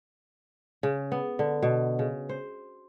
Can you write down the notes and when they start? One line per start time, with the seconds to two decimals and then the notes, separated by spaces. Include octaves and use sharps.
0.83 C#3
1.12 B3
1.39 D3
1.62 B2
1.99 C#3
2.29 C5